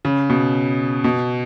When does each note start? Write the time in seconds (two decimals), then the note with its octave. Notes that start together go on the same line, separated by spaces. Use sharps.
0.05 C#3
0.30 B2
1.04 B2